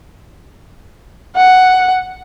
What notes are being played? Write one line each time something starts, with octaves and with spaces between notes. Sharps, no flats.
F#5